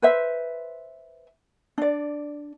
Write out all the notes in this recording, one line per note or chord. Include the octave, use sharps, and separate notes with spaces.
B4 C5 E5
D4 D5